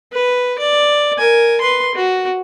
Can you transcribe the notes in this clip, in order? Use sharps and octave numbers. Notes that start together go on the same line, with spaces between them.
B4
D5
A#4 G#5
B4 C6
F#4